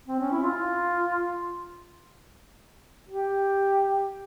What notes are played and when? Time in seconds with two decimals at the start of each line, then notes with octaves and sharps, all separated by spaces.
0.08 C4
0.19 C#4
0.31 E4
0.42 F4
3.09 G4